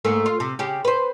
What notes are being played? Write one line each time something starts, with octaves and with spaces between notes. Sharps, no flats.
G#2 A3 A#3
F4
C3
C#3 G4
B4 C5